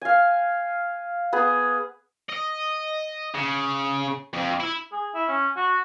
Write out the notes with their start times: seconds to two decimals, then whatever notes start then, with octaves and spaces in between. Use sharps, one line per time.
0.01 F5 G#5
1.33 B3 G#4
2.30 D#5
3.35 C#3
4.34 F2
4.60 E4
4.92 G#4
5.15 E4
5.28 C#4
5.56 F#4